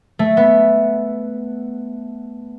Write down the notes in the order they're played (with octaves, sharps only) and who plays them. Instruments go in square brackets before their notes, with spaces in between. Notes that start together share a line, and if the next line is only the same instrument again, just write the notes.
[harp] A3
B3